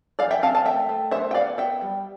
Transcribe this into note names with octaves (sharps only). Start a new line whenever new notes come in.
E3 D5 F5
E5 G5
C4 F5 A5
F5 A5
A3 E5 G5
A3
B3 C5 E5
G5
B3 D5 F5
B3 E5 G5
G3